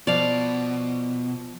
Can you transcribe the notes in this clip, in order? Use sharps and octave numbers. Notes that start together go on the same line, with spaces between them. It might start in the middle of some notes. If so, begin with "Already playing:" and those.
B2 F3 D5 F5